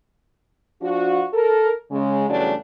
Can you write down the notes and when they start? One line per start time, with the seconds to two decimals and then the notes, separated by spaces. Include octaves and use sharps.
0.82 F3 D4 F4 F#4
1.33 A4 A#4
1.91 C#3 G#3
2.29 E2 C#3 F#3 G3 A3 D4